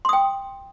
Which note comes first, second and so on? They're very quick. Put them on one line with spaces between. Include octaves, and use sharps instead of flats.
C6 D#6 G5